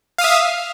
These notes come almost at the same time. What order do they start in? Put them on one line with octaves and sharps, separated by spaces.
F5 D#6 E5